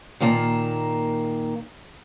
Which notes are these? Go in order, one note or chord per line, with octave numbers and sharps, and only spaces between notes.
A#2 D#3 A#3 A5